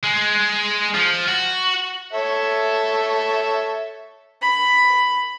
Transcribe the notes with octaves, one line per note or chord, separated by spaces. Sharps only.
G#3
F3
F#4
A4 C#5 E5
B5